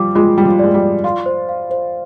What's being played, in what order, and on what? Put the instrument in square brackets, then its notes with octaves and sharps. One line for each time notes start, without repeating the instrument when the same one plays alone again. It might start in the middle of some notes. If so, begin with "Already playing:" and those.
Already playing: [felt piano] F3 G3 [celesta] D6
[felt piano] G#3 [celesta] F4
[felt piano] G3 [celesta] F4
[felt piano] F3
[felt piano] G#3 [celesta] D5
[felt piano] G3
[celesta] D5
[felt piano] F4 [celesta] C6
[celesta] C5
F5
C5